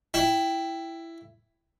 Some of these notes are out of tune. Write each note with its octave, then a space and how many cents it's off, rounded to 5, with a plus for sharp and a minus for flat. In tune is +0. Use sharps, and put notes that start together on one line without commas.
E4 +10 G5 +0